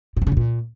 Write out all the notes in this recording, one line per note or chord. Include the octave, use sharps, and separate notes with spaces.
A#2
G2
C#3
F2
A#2